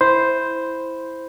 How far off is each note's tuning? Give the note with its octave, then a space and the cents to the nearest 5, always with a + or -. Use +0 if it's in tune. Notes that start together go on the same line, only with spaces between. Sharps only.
E4 +0 C5 +0 B5 +0